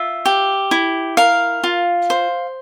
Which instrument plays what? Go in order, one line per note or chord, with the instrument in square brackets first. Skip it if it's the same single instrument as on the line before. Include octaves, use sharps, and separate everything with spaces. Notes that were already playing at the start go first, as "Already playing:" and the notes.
Already playing: [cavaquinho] F4 E5
G4
E4
A#4 F5
F4
C5